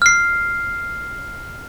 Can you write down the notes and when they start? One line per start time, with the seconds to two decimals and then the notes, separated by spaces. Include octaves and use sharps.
0.02 F6 C7